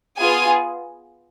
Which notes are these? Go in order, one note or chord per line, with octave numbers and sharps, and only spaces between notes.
B3 F4 G#4 G#5